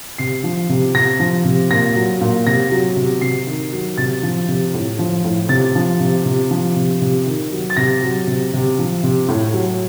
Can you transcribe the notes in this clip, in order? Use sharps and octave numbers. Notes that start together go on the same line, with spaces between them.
C3 C7
F3
C3
C3 A#6
F3
C3
A#2 A#6
F#3
A#2
C3 A#6
F#3
C3
C3 C7
D#3
F#3
C3 A6
F3
C3
A2
F3
A2
C3 A6
F3
C3
C3
F3
C3
C3
D#3
F#3
A6
C3 A#6
F#3
C3
C3
F3
C3
A2
F#3